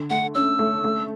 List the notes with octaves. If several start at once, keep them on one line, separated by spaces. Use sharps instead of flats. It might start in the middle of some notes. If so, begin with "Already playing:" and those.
Already playing: D3
A3 F#5
C#4 E6
A3
A3